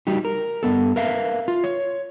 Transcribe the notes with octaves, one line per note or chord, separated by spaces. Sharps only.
G3 D#4 F#4 G4
A#4
G2 B3 A4
A#4 B4 E5 F5
F4
C#5